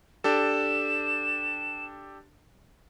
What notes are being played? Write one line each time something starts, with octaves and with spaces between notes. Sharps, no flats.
D4 G4 A4 E7